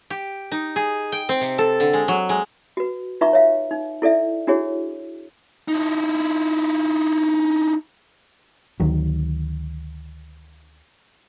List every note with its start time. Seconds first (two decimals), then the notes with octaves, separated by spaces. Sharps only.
0.10 G4
0.52 D#4
0.76 G#4
1.12 G5
1.29 C4
1.41 C3
1.58 A4
1.80 D3
1.93 G#3
2.08 F#3
2.29 G#3
2.77 F#4 B4
3.21 D#4 F4 B4 E5 A#5 C#6
3.33 C#5 E5 F5
3.71 D#4
4.02 E4 A4 D5 E5
4.47 D4 E4 F#4 G#4 C#5
5.68 D#4 E4
8.80 D2 D#3 F#3